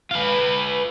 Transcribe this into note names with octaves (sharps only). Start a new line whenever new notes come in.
F4 B4